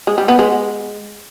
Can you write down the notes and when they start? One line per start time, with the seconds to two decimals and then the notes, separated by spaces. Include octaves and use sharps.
0.07 G#3
0.18 G3
0.28 B3
0.39 G#3